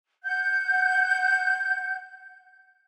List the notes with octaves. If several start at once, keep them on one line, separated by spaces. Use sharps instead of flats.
F#5 G6